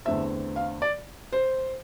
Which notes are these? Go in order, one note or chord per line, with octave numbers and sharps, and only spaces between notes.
E2 D3 A3 C4 E5
F5
D5
C5